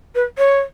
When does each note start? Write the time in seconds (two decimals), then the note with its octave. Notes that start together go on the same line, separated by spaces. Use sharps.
0.15 B4
0.38 C#5